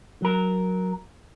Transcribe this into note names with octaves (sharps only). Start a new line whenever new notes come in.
F#3 A#4